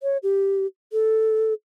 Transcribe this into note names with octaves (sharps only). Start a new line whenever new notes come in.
C#5
G4
A4